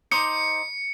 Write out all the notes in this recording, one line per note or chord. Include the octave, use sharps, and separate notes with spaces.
D#4 C5 D6 C#7